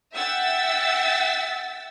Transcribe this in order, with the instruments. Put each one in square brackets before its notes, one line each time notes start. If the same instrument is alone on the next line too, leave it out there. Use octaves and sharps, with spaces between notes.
[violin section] E5 F#5 G5 E6 A6 B6